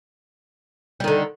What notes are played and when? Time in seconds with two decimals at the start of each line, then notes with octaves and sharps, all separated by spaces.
1.00 G3
1.04 D#3
1.08 D3